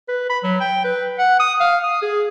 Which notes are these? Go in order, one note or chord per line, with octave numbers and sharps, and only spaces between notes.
B4
B5
F#3
G5
B4
F#5
D#6
F5
D#6
G#4